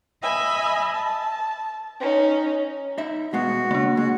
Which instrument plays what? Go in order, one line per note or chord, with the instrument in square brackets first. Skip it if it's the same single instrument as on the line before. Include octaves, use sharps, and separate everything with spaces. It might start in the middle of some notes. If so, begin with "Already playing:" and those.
[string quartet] D#5 E5 G#5 B5
A5
C#4 D#4
[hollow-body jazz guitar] D#4 E5
[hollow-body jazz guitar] B2 G#3 B3 [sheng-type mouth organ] F#4
[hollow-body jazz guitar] C#3 [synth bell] A#3 D4
[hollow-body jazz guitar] G#3 [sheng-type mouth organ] F#4